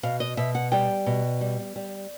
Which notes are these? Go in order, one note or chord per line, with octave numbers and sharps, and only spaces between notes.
B2 F5
D#5
B2 E5
F#5
G3 G5
B2
G3
G3